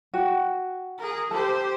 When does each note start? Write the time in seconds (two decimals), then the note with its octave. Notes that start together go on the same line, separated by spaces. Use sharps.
0.14 F#4 G5
0.98 G#4 A#4
1.31 G4 A4 C5